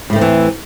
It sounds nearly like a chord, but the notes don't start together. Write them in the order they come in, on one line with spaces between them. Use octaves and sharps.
A2 A3 D#3 C4 E3